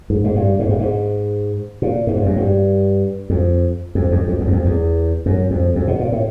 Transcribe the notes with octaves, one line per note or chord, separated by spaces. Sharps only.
G#2
G#2
G2
G#2
G2
G#2
A#2
G#2
G2
F#2
G2
F2
F2
F2
F2
E2
F#2
F2
E2
F#2
F2
F2
B2
A#2
A2